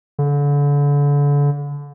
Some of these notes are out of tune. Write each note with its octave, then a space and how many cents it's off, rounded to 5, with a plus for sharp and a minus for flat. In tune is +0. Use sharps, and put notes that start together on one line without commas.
D3 -35